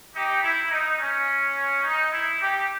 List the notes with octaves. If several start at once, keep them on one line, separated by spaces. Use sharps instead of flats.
D#4 G4
E4
D#4
C#4
D#4
E4
D#4 G4